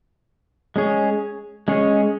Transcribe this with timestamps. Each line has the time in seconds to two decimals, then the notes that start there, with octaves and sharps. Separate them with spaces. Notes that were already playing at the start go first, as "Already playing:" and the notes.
0.76 G#3 C#4 G#4 C#5
1.68 G#3 C#4 G#4 C#5